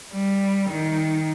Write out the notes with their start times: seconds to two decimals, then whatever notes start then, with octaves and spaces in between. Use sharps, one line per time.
0.13 G3
0.70 D#3